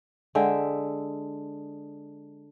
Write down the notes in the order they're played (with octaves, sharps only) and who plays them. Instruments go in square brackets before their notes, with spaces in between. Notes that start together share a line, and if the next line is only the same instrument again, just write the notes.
[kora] D3 G#3 E5 G5